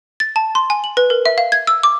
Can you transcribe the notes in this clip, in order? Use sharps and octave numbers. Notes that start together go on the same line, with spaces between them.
A6
A5
C6
G#5
F#7
B4
A#4
E5
F5
G#6
E6
D6